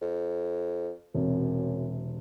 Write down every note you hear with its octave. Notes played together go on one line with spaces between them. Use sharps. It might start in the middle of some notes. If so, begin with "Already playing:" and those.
F2
E1 F#2 C3